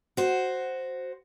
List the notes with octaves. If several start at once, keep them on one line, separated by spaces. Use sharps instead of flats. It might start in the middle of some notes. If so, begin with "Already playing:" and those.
F#4 C5